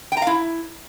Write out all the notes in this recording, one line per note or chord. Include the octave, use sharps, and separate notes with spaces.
G5
A#5
F5
E4